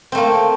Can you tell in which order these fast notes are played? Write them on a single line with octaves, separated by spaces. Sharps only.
C4 A3 A#3